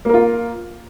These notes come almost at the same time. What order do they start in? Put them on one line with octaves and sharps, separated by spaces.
A#3 A#4 F4